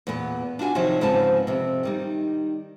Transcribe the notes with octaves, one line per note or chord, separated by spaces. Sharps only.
E2 A#2 B3 B4
D4 F4 F#4 G#5
C3 D#3 F3 F#3
G#2 C#3 F3 C4 B4 A5
F2 C3
D#3 G3 D#4